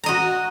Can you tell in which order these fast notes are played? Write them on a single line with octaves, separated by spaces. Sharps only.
A#5 D#5 F#4